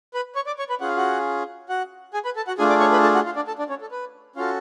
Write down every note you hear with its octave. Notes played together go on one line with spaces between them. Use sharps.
B4 B5
C#5 C#6
D5 D6
C#5 C#6
B4 B5
C#4 F4 G#4 F#5
F5
F#4 F#5
F#4 F#5
G#4 G#5
B4 B5
A4 A5
F#4 F#5
A3 D4 F4 G#4 G#5
D5 D6
C#5 C#6
B4 B5
A4 A5
F#4 F#5
F4 F5
D4 D5
A4 A5
D4 D5
C#4 C#5
A4
B4
C#4 F4 F#4 A4 F5